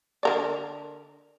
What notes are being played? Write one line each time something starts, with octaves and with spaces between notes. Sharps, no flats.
D3 A#4 D5